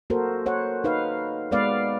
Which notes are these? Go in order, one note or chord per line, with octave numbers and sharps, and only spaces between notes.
A#3 F#4 A4 A#4 C5
C5 C#5 F#5
D#4 B4 F5
G#3 B3 B4 D5 F5